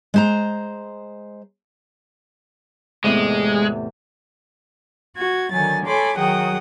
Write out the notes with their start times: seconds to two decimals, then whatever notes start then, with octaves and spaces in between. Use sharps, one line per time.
0.14 G#3 C5 A#5
3.04 E2 A2 C3 G#3
5.17 F#4 G#6
5.53 D3 D#3 F#3 G#5 A6
5.87 A4 C#5 G#5 B5 C6 D6
6.18 D#3 F#3 G#4 F#5 G5 D#6